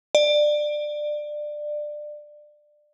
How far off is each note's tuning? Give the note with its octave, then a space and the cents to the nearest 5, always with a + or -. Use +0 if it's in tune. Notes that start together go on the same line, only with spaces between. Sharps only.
D5 +20